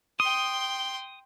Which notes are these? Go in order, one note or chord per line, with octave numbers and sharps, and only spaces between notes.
G5 C6 D#6